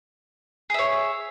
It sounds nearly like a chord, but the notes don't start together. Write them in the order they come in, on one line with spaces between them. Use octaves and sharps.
G#4 E5 C#5